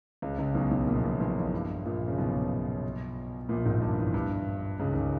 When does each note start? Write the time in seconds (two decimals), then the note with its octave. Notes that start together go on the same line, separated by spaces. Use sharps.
0.22 C#2 C#3
0.38 C#2 C#3
0.55 B1 B2
0.71 B1 B2
0.87 A#1 A#2
0.96 B2
1.04 A#1 A#2
1.20 B1 B2
1.36 E2
1.53 G2
1.85 A#1 A#2
2.08 C#3
2.18 B1 B2
3.49 A#1 A#2
3.65 G#1 G#2
3.82 G2
3.98 E2
4.14 G2
4.79 C#2 C#3
4.91 D#3
4.96 C#3